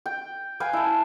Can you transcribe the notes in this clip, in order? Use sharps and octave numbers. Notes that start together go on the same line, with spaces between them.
G5
B4 F5 G5 G#5
E4 A5